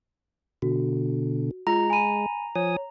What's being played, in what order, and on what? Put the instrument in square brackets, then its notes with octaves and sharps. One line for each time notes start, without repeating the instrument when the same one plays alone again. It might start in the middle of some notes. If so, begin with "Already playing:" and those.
[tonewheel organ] B2 D3 [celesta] F#4
[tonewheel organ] G#3 [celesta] F4 [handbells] A#5
[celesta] G#5 B5 D#7
[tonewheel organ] F3 G#5 D#6 [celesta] C#5